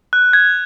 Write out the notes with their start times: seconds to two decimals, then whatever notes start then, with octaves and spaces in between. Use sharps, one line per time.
0.13 F#6
0.33 G#6